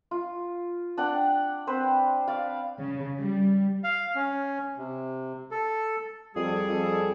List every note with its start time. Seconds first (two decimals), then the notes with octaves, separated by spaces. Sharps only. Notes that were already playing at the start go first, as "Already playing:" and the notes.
0.11 F4
0.97 D4 D5 F#5 G5
1.67 C4 B4 C5
2.28 D5 F5
2.79 C#3
3.17 G3
3.84 F5
4.16 C#4
4.77 C3
5.51 A4
6.36 F2 G3 G#4 A4
6.69 F2